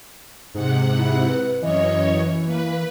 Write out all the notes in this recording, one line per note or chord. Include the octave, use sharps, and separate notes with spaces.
G#2 C3 F#5
E4
B4
F#2 E3 C#5 D#5
A#3 B4